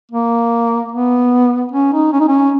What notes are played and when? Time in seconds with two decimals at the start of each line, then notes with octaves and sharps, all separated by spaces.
0.12 A#3
0.92 B3
1.72 C#4
1.93 D#4
2.13 C#4
2.21 D#4
2.28 C#4